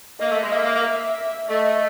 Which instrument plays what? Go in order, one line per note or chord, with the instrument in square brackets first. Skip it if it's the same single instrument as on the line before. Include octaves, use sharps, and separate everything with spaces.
[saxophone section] A#3 [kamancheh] D#5
[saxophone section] A3
G#3
[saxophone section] A#3 [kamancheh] E5
[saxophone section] A#3
A#3
[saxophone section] A3 [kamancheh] D#5